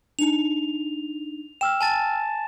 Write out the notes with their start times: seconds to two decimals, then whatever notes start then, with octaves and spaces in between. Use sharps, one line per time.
0.19 D4 D#4 F7
1.61 G5 E6 F6 E7
1.81 G#5 A5 A6